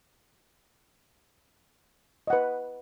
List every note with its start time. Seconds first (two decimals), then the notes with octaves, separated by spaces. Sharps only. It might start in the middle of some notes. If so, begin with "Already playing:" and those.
2.27 D#5
2.30 F#5
2.33 B4